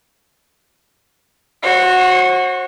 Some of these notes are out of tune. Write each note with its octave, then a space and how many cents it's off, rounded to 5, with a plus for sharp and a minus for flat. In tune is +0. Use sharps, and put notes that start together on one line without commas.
F#4 -10 C5 +45